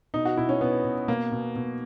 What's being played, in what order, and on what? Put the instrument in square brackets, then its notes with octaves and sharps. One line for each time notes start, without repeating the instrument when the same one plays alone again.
[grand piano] B2 D#4
F#4
B2 E4
C#4
B2 B3
B2
B2 A#3
B2
B2